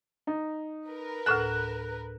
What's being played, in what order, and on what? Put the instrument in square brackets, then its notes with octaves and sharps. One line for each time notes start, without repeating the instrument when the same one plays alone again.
[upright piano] D#4
[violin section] A#4 B4
[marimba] D2 A2 A4 [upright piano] F#6 E7